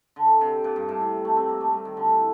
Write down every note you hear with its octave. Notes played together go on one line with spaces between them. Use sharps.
D3
C3
A#2
G2
A2
C3
A3
C4
A#3
A3
G3
D#3
D3
A2